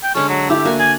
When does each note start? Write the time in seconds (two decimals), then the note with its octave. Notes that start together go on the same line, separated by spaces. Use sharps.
0.03 G5
0.15 D3 G#3 C#4 A4
0.29 F#3
0.50 A3 E4 G4
0.65 A#3 F#4 G#5
0.80 D5 G#5